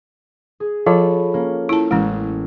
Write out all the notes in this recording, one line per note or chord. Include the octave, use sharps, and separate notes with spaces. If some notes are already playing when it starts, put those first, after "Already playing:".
G#4
F3 F4 A4 C#5 B5
A#3 C#4
E4 A5 E6
A1 G#3 C#4 E6